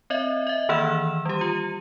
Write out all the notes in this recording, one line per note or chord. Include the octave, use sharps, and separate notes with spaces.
C4 C#5 D#5 E5
D#5 E5
D#3 E3 A#3 E6 F6 E7
G3 G4
F4 D#7